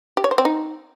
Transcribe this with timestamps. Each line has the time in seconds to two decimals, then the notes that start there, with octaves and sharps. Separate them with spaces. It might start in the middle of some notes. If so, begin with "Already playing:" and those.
0.17 G4
0.24 C#5
0.31 C5
0.38 C4
0.45 D#4